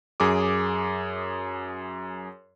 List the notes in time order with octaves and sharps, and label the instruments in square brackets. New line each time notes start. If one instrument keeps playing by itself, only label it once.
[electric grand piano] F#2 G#4 D6